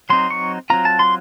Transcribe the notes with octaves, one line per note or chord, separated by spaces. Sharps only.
F#3 C4 D#4 C6
C#6
F#3 C4 F4 A#5
A5
C6